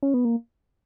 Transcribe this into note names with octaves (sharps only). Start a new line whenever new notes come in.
C#4
B3
A#3